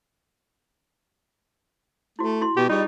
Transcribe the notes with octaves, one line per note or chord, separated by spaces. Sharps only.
A3 E4 F#4
E4 F#4 C6
B2 G4
G3 D#4 F4 G#4 D#5